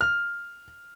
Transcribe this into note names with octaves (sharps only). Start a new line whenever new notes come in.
F6